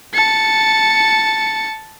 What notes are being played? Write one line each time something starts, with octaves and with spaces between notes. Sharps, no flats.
A5 C#7